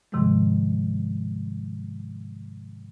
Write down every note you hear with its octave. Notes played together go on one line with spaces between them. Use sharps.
G#2 C3 D#3 F3 G3 G#3